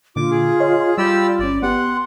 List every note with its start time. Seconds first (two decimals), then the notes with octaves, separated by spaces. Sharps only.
0.16 A#2 D3 F4 D6
0.31 G#4
0.60 C#5 D#5 C6
0.98 G3 F4 G4 D5 B5 E6 G6
1.39 G1 C#4 D5
1.63 B3 G4 F#5 C6